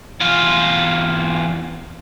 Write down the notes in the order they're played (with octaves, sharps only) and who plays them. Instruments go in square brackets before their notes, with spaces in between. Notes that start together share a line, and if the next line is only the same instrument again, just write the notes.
[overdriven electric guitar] E2 F4